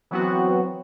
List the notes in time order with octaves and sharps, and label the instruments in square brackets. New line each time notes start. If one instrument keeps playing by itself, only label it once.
[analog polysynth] E3 F#3 B3 C4 F#4